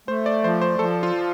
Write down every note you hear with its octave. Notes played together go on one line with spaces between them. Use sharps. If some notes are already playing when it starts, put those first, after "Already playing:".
A3 C5
D5
F3 C5
C5
F3 A4
F4
F3